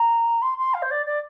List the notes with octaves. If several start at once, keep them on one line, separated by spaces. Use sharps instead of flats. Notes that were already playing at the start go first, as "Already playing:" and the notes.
Already playing: A#5
C6
C6
F5
C5
D5
D5